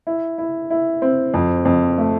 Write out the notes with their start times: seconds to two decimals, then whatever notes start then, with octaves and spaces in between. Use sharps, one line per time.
0.07 E4
0.38 E4
0.70 E4
1.02 C4
1.34 F2
1.65 F2
1.98 A3